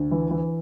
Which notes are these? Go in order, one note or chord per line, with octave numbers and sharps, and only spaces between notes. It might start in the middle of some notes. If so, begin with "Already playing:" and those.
Already playing: D2
E3
E3